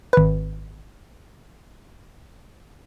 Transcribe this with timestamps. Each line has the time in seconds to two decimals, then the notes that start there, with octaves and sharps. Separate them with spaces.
0.13 G#1 B4